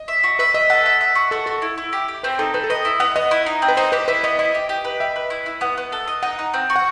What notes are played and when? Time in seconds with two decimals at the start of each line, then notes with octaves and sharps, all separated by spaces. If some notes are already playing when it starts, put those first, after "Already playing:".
Already playing: D#5
0.08 E5
0.24 F#4
0.39 B4 E5
0.54 D#5 E5
0.70 A4 F#5
0.86 E5
1.01 E5
1.15 F#4
1.31 F#4 A4
1.46 F#4 A4
1.62 E4
1.78 E4
1.93 G4
2.08 G4
2.23 C4 B4
2.39 D#4 A4
2.54 C4 B4
2.64 A4
2.70 B4 D#5
2.85 E4
3.00 B3 F#5
3.16 B3 D#5
3.31 E4
3.46 D#4
3.62 C4
3.68 B4
3.77 D#4 C5
3.92 G4 B4
4.08 E4 B4
4.24 B3 D#5
4.39 E4 D#5
4.55 G4
4.69 G4
4.85 B4
5.00 G4 E5
5.16 B4
5.30 E4
5.46 E4
5.61 B3 F#5
5.78 B3
5.92 A4
6.08 D#5
6.23 D#4 F#5
6.39 D#4
6.54 C4
6.70 F#4
6.76 F#5